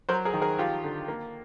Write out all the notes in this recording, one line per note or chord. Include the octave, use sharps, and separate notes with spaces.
F#3 A#4 C5
G#4 A#4
D#3
G#4 A#4
F3 F4 G4
D3
A#3